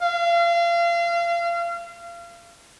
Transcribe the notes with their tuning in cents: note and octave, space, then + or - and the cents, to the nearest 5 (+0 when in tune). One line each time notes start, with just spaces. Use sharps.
F5 -30